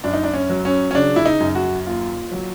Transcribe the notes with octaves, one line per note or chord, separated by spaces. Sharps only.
F#2 D4
D#4
D4
C#4
F#3
C#4
C#4
C#3 D4
E4
D#4
F#2
F#4
D#2 F4
F#3